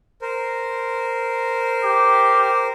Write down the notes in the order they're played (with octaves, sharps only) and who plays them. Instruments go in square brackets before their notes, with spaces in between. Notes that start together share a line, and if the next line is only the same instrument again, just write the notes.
[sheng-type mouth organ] A#4 C5
[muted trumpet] G4